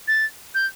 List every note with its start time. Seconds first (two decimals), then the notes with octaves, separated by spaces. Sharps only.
0.08 A6
0.55 G6